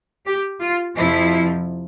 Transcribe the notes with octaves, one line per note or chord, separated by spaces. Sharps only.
G4
F4
F2 C3 F3 E4